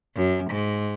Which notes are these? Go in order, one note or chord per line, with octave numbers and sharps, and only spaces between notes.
F#2
G#2